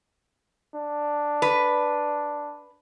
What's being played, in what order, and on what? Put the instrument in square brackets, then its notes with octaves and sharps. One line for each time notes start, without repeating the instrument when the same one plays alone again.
[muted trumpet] D4
[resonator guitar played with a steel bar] B4